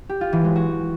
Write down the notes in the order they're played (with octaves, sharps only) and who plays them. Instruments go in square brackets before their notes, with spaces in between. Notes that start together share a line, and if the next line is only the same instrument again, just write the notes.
[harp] G4
F4
E3
G#3
F#4